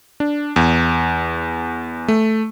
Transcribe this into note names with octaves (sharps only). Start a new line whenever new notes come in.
D4
E2
A3